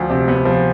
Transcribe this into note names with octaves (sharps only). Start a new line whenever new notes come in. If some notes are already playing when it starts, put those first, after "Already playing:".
Already playing: D2 F3
C3
B3
F3